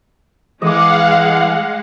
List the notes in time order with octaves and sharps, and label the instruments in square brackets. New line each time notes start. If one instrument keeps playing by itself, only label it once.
[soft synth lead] E3 [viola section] G#3 [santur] D#5 D6 [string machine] F5 F#5